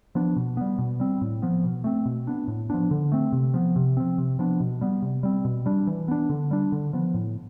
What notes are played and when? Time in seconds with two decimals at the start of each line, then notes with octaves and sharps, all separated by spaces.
0.15 F3 B3 D4
0.36 B2
0.57 G3 B3
0.78 B2
1.00 G3 C4
1.21 A2
1.42 F3 B3
1.63 B2
1.84 A3 C4
2.05 B2
2.27 B3 D4
2.48 A2
2.70 F3 B3 D4
2.91 D3
3.12 A3 C4
3.32 C3
3.54 F3 B3
3.76 C3
3.97 F3 C4
4.18 C3
4.39 F3 B3 D4
4.60 B2
4.81 G3 B3
5.02 C3
5.23 G3 C4
5.45 B2
5.66 G3 D4
5.87 E3
6.08 B3 D4
6.29 D3
6.51 G3 D4
6.72 D3
6.93 F3 B3
7.14 A2